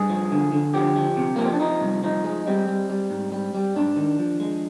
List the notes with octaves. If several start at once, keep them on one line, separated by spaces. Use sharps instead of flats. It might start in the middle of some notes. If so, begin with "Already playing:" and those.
Already playing: G2 G#4
F3
D3
D3
F3 G4
F3
C3
A#3
F3
C4
D4
F3 D#4
C2
F3 D#4
G#3
G3 C4
G3
G3
G#2
G3
G3
G#2 D4
D#3
F3
G#3